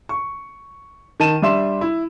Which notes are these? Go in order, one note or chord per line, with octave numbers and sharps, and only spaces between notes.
C#6
D#3 A5 D#7 E7
G3 D4 E5 C6 E7
E4